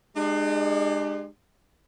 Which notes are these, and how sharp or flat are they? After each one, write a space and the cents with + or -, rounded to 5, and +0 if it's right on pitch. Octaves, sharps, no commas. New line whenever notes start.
G#3 +0 D4 +45 G4 +15